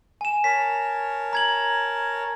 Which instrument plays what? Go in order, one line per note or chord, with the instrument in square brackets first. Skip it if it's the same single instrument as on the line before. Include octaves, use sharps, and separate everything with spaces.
[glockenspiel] G#5 E7
[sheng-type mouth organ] A#4 C#5 A5 [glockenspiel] B6
[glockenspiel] A#5 G#6 F#7